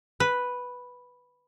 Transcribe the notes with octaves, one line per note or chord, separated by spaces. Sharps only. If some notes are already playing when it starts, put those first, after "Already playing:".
B4